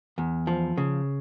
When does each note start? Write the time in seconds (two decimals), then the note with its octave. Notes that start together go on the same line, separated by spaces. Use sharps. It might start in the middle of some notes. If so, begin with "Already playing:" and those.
0.18 E2
0.47 F3
0.77 C#3